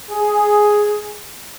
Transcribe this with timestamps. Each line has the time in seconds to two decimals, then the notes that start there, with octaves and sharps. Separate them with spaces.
0.11 G#4